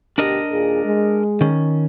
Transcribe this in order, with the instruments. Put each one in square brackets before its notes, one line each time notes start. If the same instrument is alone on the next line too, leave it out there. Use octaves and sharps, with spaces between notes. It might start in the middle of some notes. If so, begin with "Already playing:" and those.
[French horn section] D2 B2 G4 [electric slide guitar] D4 A#4 D#5
[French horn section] D#2 A#2 G#4
G#3
[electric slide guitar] D#3 C#4